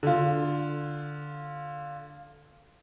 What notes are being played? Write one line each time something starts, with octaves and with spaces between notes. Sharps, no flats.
D3 F4